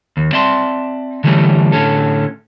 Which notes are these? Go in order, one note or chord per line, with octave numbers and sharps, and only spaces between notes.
D#2
C4 D5 E5 A5 C6
D3 E3 G3 A3 C#4
A2 D3 C#4 A4